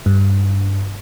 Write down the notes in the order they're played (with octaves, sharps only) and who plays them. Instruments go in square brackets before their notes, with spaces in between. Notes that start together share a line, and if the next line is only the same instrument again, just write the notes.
[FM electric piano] G2